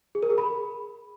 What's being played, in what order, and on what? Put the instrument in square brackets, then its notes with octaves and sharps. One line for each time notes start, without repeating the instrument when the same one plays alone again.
[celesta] G#4
A#4
G#4
B5